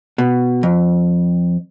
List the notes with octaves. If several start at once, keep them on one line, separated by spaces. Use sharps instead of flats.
B2
F2